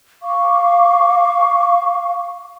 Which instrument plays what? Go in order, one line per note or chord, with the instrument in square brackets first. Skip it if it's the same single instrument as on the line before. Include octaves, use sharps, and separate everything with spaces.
[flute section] F5 C#6 D6